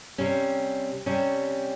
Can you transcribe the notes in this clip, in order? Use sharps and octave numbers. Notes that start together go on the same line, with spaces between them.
C3 G3 C#4
C3 G3 C#4